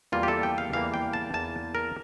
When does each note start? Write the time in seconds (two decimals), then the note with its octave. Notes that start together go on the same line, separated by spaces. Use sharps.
0.12 E2 E3 G3 A#3 F4
0.23 G4
0.28 A4
0.43 G5
0.58 F5
0.73 E2 E3 G3 A#3 F5
0.94 G5
1.13 A5
1.34 E2 E3 A#3 A5
1.75 A#4